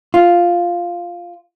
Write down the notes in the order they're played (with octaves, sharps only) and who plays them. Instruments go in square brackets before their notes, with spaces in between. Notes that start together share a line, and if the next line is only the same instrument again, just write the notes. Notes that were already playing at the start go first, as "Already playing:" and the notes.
[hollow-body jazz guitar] F4